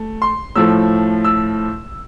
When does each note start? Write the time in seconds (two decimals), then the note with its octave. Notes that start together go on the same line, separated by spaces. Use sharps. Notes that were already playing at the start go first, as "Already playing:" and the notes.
Already playing: A3
0.22 C6
0.56 A2 F3 A3 E6
1.25 E6